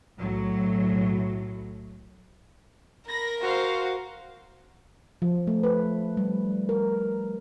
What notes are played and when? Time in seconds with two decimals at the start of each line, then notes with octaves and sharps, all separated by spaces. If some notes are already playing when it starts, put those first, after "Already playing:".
0.20 B1 A2 F#3
3.10 A#4 B5 A#6
3.41 F#4 C5 F5
5.22 F3
5.47 A3
5.63 B4
6.17 G3
6.69 A#4